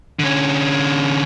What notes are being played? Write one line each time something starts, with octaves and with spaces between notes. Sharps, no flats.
D3 C#4